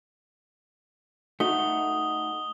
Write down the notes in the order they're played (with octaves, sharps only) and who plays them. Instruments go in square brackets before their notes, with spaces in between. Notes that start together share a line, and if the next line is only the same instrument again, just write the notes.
[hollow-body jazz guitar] A3 D#4 F#4 [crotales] D#6 G7